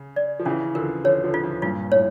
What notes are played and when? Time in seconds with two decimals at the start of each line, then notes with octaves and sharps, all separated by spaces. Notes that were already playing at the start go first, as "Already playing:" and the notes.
Already playing: C#3
0.16 D5
0.39 F3
0.46 C#3 E3 C#4
0.75 D3 F3 A#4
1.04 D3 F3 C#5
1.24 D3 F3
1.34 F4
1.43 D3 F3
1.62 G2 A#2 F4
1.92 A2 C#5